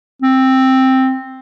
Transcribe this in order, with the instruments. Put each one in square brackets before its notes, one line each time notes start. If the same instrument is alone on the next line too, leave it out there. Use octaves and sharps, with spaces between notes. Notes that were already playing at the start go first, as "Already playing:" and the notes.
[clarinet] C4